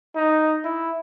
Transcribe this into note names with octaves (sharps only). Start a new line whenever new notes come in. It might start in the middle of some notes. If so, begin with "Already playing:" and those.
D#4
E4